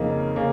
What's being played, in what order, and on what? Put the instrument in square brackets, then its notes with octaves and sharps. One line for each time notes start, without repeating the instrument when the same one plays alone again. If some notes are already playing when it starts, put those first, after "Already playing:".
Already playing: [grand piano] F2 C#3 A#3 D#4
C#3 A#3